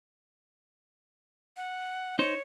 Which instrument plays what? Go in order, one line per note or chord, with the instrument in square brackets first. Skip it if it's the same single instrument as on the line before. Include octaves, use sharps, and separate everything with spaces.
[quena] F#5
[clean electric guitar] D#4 C5 [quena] C#5